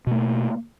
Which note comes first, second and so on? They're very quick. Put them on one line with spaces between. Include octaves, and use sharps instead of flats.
B2 A3 A#3